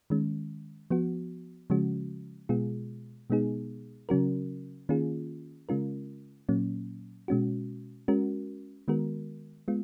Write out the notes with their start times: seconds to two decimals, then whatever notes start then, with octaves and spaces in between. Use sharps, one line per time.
0.10 D#3 G#3 C#4
0.90 F3 B3 F#4
1.70 C#3 F3 G#3 C#4 F#4
2.49 B2 G#3 B3 F4 G#4
3.30 B2 G#3 B3 D#4 G#4
4.09 C#3 F#3 C#4 F#4 A#4
4.89 D#3 A#3 C#4 F4 G#4
5.69 C#3 G#3 C#4 F4 A#4
6.49 A#2 F#3 A#3 C#4
7.28 B2 G#3 C#4 F#4
8.08 G#3 C#4 F#4 A#4
8.88 D#3 G#3 B3 F#4 A#4
9.68 G#3 B3 F4